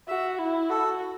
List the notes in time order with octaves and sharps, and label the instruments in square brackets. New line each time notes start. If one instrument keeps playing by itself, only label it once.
[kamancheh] F#4 [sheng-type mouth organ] E5
[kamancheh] E4
[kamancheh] F#4 [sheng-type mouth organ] A4